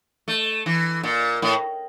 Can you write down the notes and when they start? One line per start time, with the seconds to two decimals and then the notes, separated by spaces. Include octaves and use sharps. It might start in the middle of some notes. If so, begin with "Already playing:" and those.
0.28 A3
0.66 E3
1.03 A#2
1.42 A2